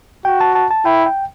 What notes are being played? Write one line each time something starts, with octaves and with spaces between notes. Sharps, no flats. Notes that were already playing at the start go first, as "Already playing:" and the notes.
F#4 G5
A5
A5
A5
E4 G5
G5